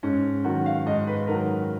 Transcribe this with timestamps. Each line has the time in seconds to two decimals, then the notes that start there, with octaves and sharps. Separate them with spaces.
0.03 G#2 C#4
0.45 D#3 F#3 F#4
0.66 F5
0.86 G#2 D#5
1.07 B4
1.28 D#3 F#3 A#4